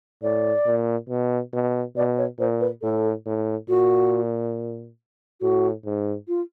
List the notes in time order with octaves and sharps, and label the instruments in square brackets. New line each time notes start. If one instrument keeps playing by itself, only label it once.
[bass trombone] A2 [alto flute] D5
[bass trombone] A#2
B2
B2
[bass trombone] B2 [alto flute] D5
[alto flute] C#5
[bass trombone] A#2 [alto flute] C5
[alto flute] B4
[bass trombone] A2 [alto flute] A4
[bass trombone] A2
[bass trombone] A#2 [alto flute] F#4
[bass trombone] A2 [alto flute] F#4
[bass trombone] G#2
[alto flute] F4